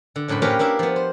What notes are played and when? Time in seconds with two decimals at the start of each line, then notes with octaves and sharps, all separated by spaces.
0.16 D3
0.28 F#2 A2 D4 C5 B5
0.42 A#3 C#4 D4 G4 A#4 B4
0.59 A#3 D4 E4 E5
0.79 F3 B3
0.96 C5